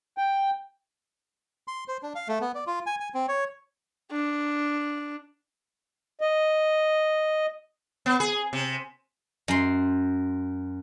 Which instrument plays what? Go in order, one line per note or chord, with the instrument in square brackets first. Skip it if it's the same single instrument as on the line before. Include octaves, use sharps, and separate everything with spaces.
[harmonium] G5
[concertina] C6
C5
D4
F5
A3
B3
D5
F4
G#5
G#5
C4
C#5
[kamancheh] D4
[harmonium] D#5
[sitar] B3
G#4
C3
[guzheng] F#2 C6